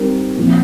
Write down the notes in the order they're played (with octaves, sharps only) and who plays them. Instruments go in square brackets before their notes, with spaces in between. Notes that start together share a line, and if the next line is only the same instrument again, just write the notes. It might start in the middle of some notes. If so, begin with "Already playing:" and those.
Already playing: [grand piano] G3 C4 D#4 A#4
A#2 F3 C4